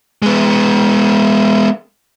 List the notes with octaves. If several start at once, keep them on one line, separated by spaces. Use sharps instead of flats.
G#3 B3